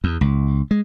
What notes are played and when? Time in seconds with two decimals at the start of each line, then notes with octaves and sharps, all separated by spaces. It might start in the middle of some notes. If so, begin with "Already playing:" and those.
0.04 E2
0.21 C#2
0.71 G#3